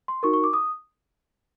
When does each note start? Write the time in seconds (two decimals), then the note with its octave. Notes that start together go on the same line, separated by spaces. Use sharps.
0.08 C6
0.23 D#4 F#4 A#4 C#6
0.33 C#6
0.44 D6
0.53 D#6